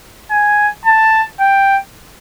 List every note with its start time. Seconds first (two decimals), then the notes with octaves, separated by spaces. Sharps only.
0.31 G#5
0.86 A5
1.40 G5